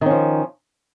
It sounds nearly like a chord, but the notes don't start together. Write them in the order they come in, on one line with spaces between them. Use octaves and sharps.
D#3 C#4 F3